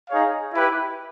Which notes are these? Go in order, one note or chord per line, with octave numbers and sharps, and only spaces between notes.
D#4 G#4 C#5 F5
E4 G4 B4